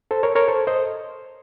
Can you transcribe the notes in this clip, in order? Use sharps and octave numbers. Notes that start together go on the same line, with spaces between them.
A4 C5
A#4 C#5
A#4 C#5
A4 C5
C5 D#5